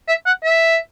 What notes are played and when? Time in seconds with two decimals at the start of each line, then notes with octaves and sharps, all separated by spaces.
0.08 E5
0.26 F#5
0.44 E5